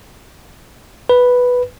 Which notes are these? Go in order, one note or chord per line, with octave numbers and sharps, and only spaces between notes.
B4